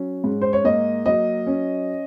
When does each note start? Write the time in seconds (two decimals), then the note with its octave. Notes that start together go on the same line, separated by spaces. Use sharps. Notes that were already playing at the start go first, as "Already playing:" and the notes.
Already playing: F#3 C#4
0.24 G#2
0.42 C5
0.53 C#5
0.64 A#3 D#5
1.06 F#3 D#5
1.47 C#4